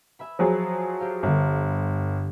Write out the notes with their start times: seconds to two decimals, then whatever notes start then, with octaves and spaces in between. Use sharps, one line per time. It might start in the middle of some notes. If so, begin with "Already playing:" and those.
0.19 E5 G#5 B5
0.39 F3 F#3 G#4
1.00 G4 C5 F5
1.23 G1 G2 D3